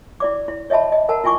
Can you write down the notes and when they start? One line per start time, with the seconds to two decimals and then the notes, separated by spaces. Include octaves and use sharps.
0.20 E4 D5 D6
0.48 E4
0.70 C#5 D#5 E5 A5 B5
0.92 D#5
1.09 A#4 F#5 A5 A#5
1.24 E4 F4 G#5 C#6 D6